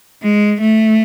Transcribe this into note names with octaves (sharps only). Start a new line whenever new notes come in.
G#3
A3